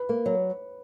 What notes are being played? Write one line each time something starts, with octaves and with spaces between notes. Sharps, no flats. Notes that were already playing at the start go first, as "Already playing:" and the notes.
Already playing: B4
A#3
F#3